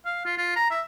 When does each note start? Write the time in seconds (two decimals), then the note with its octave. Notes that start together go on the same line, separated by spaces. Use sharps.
0.05 F5
0.25 F4
0.37 F4
0.56 A#5
0.71 E5